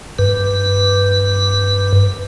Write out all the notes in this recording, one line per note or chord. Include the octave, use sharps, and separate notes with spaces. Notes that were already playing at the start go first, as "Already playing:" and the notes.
G2 B4